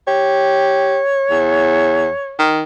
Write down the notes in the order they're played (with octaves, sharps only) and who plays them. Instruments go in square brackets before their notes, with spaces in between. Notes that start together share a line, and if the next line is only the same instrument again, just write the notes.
[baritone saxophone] G4 [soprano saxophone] C#5
[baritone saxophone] E2
D#3